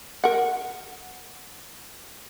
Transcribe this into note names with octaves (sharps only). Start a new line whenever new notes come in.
A#4 F#5